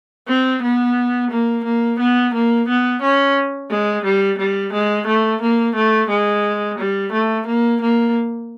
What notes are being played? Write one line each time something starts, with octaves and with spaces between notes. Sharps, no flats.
C4
B3
A#3
A#3
B3
A#3
B3
C#4
G#3
G3
G3
G#3
A3
A#3
A3
G#3
G3
A3
A#3
A#3